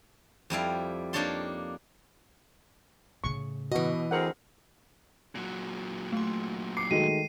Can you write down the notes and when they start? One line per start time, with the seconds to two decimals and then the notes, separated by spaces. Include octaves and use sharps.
0.50 F2 G3 E4 F5
1.13 A#3 D4 D#4 C#5 A5 C6
3.24 A2 C#3 C#6
3.72 B2 E3 F#4 D#5
4.11 D2 C4 G#4 A#4 F#5
5.35 A#2 F#3
6.13 A3 C6
6.77 D6 C7 C#7
6.91 D#3 G#3 A3 F#4 D#7